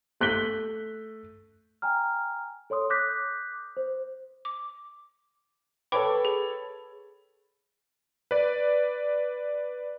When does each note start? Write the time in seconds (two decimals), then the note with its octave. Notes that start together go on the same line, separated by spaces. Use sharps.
0.20 A3 F#6 B6 G7
1.82 G5 G#5 A#5 F6
2.70 A4 C#5 C6 D#6
2.90 D6 D#6 F#6 G6 A#6 B6
3.77 C5
4.45 D6
5.92 A4 B4 C#5 G5 B5 D6
6.25 G#4
8.31 B4 D5